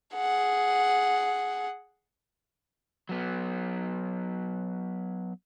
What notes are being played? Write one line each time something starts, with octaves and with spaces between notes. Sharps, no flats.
G#4 F#5
F#3 B3